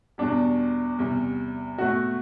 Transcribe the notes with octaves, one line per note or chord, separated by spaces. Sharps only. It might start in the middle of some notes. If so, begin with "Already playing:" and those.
E2 B2 G3 D4
E2 C3 G3
B2 A3 F#4